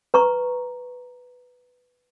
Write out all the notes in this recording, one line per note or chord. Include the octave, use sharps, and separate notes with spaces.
B4 A#5 C#6